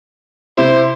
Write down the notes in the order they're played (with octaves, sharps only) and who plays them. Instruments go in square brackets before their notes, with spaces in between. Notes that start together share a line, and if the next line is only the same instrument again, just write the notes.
[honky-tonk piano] C3 E4 [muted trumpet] C5